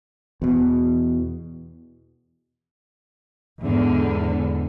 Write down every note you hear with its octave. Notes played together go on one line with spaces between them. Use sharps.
E2 B2
E2 G#2 D3